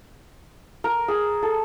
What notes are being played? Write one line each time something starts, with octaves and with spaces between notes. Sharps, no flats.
A#4
G#4
A4